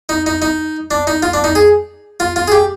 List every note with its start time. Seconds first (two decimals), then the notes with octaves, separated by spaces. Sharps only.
0.09 D#4
0.26 D#4
0.42 D#4
0.91 D4
1.07 D#4
1.23 F4
1.34 D4
1.44 D#4
1.55 G#4
2.20 F4
2.36 F4
2.48 G#4
2.52 G4